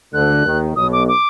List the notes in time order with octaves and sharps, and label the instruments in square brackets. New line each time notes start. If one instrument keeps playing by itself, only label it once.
[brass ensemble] D2 D3 [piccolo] F#6
[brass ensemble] D#2 D#3
[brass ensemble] B1 B2 [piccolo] D#6
[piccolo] D6
D6